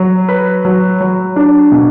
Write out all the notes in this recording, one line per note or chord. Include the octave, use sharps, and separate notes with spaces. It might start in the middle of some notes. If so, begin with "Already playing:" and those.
Already playing: F#3
B4
F#3
F#3
D4
B2